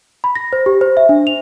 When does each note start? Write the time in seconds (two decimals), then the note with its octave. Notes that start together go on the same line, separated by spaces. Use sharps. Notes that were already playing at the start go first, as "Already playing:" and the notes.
0.24 B5
0.35 A#6
0.53 C5
0.66 G4
0.81 C5
0.97 E5
1.09 D4
1.27 F7